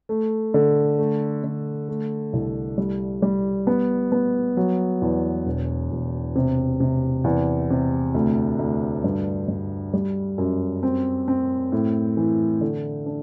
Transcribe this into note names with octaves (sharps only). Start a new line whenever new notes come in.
A3
D3
A3
D3
A3
C2
G3
G3
B3
B3
F#3
E2
E1
E1
C3
C3
E2
C3
D2
D2
G2
G2
G3
F#2
C4
C4
A2
E3
D3
D4